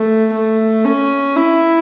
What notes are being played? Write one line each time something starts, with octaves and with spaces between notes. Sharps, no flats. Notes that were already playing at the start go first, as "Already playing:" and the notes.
Already playing: A3
A3
C#4
E4